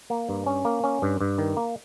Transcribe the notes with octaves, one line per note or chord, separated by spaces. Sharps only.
A#3
G2
C#4
A#3
C#4
G2
G2
D#3
A#3